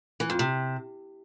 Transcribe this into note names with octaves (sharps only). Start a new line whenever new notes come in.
E3
F2
C3